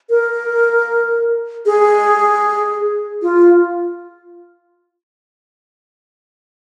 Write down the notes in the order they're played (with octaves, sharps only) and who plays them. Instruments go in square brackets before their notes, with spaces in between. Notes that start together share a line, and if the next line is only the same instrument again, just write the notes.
[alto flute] A#4
G#4
F4